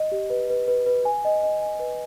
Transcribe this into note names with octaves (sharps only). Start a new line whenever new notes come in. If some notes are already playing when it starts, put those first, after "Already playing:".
Already playing: D#5
G4
B4
B4
B4
B4
G#5
D#5
D#5
G#5
B4